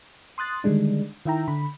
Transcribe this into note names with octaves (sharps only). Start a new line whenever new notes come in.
C6 D#6 F#6 A6
D3 D#3 G3 G#3 D4
D#3 E4 E5 G5 A#5
D3 B5